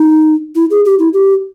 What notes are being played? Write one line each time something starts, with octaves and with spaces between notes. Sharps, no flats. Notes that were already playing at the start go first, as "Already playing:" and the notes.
Already playing: D#4
E4
G#4
G4
E4
G4